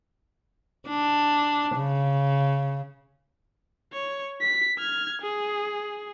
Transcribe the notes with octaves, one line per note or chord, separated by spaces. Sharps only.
D4
C#3
C#5
B6
F6 G#6
G#4